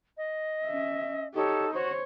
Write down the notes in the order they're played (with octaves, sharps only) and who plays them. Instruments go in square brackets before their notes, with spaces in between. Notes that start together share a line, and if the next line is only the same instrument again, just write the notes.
[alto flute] D#5
[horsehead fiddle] C#4 E5
[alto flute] D#4 [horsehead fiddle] G4 C#5 [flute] A4
[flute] F#4 [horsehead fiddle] C5 C#5